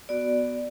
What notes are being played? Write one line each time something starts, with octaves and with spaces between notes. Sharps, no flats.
B3 F#4 D5